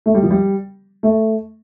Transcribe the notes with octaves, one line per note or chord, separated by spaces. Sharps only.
A3
G3
F3
G3
A3